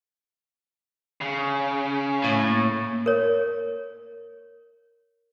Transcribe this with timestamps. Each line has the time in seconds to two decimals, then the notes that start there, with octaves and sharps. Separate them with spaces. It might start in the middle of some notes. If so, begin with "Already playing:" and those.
1.21 C#3
2.24 A2
2.48 A#3
3.06 A#4 C#5